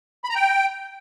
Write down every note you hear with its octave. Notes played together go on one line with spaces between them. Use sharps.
B5
A#5
G5